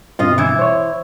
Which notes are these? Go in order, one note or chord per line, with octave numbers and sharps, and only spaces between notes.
G2 B2 C4 F4 D#5
E3 E4
C5 C#5